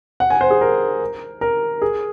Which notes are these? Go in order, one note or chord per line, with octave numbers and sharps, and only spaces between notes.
F#5
G#5
C5
G#4
A#4
A#4
G#4